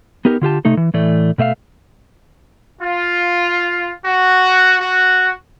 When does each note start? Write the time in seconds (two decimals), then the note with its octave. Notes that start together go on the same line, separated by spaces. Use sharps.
0.25 B3 D#4 G4 A#4
0.42 D3 F4 G4 A5
0.65 C3 A3 D#4 A4
0.77 E3
0.94 A2 E3 A3 D5
1.38 B2 A3 E5 F5
2.79 F4
4.05 F#4
4.79 F#4